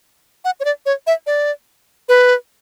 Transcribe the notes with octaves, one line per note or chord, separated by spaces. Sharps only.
F#5
C#5
D5
C#5
E5
D5
B4